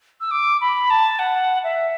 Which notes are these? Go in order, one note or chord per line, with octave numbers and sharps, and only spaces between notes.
E6
D6
B5
A5
F#5
E5